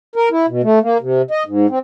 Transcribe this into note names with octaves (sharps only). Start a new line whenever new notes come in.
A#4
E4
B2
A3
A#3
C3
D#5
G#2
C4